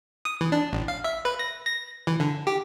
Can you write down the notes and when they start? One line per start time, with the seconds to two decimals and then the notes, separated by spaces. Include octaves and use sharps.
0.25 D#6
0.41 E3
0.52 D4
0.73 A1
0.88 F5
1.04 E5
1.25 B4
1.39 A#6
1.66 A#6
2.07 E3
2.20 D3
2.47 G4